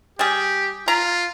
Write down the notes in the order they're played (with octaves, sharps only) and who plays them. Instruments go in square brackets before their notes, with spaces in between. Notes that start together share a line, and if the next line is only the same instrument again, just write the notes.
[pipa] G3 G#4 [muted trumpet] G4
[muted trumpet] F4 [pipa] A#5